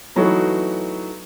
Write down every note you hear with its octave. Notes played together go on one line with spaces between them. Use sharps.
E3 F#3 A3 B3 D#4 F#4